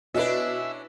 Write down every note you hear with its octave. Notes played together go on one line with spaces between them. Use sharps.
B2 C#4 D4 E4 B4 D#5 E5